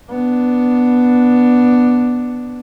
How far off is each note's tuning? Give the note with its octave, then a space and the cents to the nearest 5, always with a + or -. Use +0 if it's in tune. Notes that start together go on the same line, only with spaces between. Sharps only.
B3 +0 D4 +0